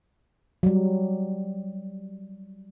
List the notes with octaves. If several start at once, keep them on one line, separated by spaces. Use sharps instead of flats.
F#3 G3